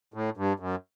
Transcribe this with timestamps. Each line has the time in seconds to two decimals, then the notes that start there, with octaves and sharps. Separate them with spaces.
0.14 A2
0.37 G2
0.60 F#2